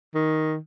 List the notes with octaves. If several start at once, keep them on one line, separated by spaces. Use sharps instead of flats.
D#3